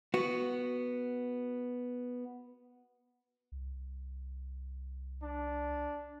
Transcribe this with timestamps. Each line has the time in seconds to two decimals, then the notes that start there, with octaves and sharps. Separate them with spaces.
0.14 B3 F#4
3.52 C2
5.23 D4